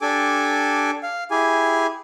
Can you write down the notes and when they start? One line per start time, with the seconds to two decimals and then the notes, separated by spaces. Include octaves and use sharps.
0.01 D4 G4 A4 G#5 D6
1.03 F5
1.31 E4 G4 G#4 G#5